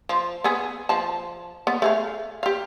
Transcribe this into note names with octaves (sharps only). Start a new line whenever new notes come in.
F3
B3 G#4
F3 A5
B3
A3 G#4 F5
G4 F5